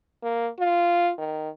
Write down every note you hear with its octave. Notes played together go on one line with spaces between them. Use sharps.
A#3
F4
D#3